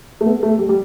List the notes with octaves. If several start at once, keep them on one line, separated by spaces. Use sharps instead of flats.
A3
B3
A3
G3
G3